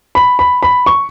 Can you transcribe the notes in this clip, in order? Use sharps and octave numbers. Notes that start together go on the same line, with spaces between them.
B5
B5
B5
C#6